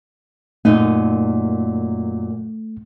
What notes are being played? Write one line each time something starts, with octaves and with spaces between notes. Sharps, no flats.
F#2 A#2 A3 D#4